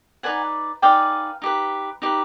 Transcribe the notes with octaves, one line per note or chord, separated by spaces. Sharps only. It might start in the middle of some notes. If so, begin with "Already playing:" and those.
D#4 G#4 B4 D5 F#5 G#5
D#4 G#4 B4 D5 F5 G5
D#4 G4 B4
D#4 G4 B4